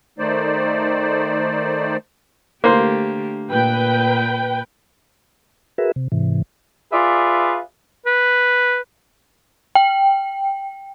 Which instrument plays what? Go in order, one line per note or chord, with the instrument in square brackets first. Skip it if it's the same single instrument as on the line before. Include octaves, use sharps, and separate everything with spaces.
[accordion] D#3 A3 D#4 C5 D5
[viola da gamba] D3 A3 G4 [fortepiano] A#3 C5
[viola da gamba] A#2 [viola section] B4 G5
[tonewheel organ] F#4 G#4 A#4 B4 E5
C3
G#2 C3 E3
[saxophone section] F4 G#4 B4 D5 E5
[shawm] B4
[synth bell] G5